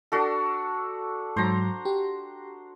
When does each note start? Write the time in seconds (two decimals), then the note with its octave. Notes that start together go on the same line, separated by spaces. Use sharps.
0.12 D4 F#4 A4
1.36 G#2 F#3 C5 A#5
1.85 G4